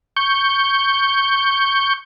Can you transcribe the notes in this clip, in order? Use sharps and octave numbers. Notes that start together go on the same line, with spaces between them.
C#6 G6